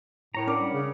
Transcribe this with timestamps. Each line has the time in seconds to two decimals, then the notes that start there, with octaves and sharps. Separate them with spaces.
0.35 A2 A#4 C#5 A#5
0.47 C#4 D4 A#4 D5 F#5
0.61 G3
0.73 C#3